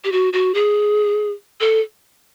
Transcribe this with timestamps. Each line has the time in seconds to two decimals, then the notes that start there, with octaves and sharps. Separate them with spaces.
0.04 G4
0.12 F#4
0.33 F#4
0.55 G#4
1.61 A4